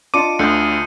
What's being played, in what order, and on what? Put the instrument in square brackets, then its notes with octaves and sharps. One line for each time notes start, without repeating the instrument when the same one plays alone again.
[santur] D4 F4 D#5 [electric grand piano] D6 [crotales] C#7 D#7
[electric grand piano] D2 D3 [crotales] D#6 G6 C#7